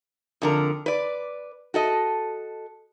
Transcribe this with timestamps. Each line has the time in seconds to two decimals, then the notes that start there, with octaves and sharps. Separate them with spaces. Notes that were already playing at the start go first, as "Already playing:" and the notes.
0.42 F2 D3 A#4
0.86 B4 D5
1.74 F#4 A4 D#5